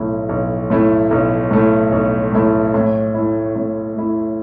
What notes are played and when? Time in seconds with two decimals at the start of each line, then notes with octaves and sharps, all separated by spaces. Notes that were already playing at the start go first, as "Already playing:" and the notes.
Already playing: B1 A2 A3 E4
0.29 B1
0.70 A2 A3 E4
1.11 B1
1.51 A2 A3 E4
1.92 B1
2.33 A2 A3 E4
2.74 A2
3.14 A3 E4
3.56 A2
3.96 A3 E4